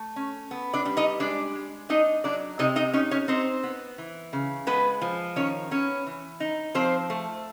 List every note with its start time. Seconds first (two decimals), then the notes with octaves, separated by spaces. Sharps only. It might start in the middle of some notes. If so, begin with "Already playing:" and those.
Already playing: A3
0.16 C#4
0.51 B3
0.74 D4 D5
0.85 G3
0.97 D#4 D#5
1.20 G#3 D4 D5
1.55 G#3
1.89 D4 D#4 D#5
2.24 F#3 D4 D5
2.59 C3 D#4 D#5
2.76 D#4 D#5
2.93 C#4 D#4 C#5
3.11 C#4 C#5
3.28 C4 D#4 C5
3.63 B3
3.98 E3
4.33 C#3
4.67 G#3 B3 B4
5.02 F3
5.36 D#3 C#4 C#5
5.71 B3 C#4 C#5
6.06 E3
6.40 D#4
6.75 F3 C4 C5
7.10 A3